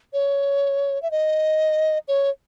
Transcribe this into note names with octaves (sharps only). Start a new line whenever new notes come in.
C#5
E5
D#5
C#5